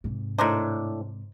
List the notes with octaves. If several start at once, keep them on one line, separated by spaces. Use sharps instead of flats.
G#2 C3
A2 D4 D#4 A#4 C5